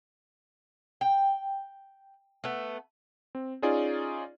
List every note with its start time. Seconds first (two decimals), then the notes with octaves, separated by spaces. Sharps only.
1.01 G5
2.44 A3 B3
3.35 C4
3.62 C#4 D#4 F4 G#4 D5